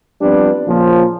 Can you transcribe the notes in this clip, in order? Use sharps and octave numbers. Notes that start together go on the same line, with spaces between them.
F3 G3 B3 C4 D4
A#2 C#3 F3